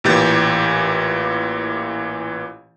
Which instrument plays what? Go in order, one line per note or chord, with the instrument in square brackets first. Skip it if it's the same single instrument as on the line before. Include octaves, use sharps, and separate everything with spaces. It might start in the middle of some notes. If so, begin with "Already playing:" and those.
[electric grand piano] A1 A#2 E3 G4 G6 A6